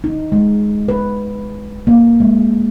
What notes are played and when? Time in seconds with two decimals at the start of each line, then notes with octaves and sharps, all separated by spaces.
0.04 D#4
0.32 G#3
0.88 B4
1.87 A#3
2.20 G#3